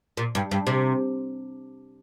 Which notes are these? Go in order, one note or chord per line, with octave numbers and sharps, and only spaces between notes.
A#2
G2
G2
C3